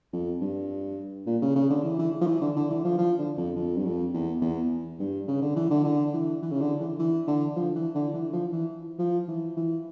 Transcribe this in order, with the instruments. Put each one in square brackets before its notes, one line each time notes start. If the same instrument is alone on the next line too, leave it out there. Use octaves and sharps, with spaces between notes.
[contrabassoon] F2
G2
A#2
C#3
C#3
D3
E3
E3
F3
E3
D3
D3
E3
F3
F3
D3
F2
F2
G2
F2
E2
E2
G2
C#3
D3
E3
D3
D3
E3
E3
C#3
D3
E3
E3
D3
F3
E3
D3
E3
F3
E3
F3
E3
E3